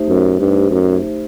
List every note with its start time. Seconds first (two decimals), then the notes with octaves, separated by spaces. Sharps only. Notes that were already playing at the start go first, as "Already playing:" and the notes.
Already playing: A3 D#4 G4 C5 E5
0.08 F#2
0.40 G2
0.71 F#2